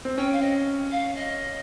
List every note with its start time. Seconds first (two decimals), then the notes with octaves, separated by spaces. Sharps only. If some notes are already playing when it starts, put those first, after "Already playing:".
0.05 C4
0.18 C#4 G5
0.32 F5
0.41 D#5
0.91 F5
1.15 D#5